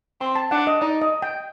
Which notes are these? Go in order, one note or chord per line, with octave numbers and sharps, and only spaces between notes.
C4 C6
A5
D4 F#5
D#5
D#4 D5
D#5
G5